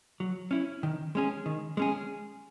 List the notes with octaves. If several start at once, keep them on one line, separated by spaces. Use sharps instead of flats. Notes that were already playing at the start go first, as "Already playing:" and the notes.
F#3
C#4 E4
D#3
G#3 C#4 G#4
D#3
G#3 C#4 G#4